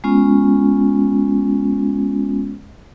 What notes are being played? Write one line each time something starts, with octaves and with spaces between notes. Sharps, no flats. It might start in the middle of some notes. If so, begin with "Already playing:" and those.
G#3 B3 C#4 F4